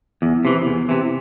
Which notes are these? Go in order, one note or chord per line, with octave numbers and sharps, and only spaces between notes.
E2
C3 E3
E2
C3 E3